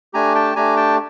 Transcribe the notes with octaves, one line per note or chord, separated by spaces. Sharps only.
A3 D4 G4 G#5 A#5
G5 A5
A3 D4 G4 G#5 A#5
G5 A5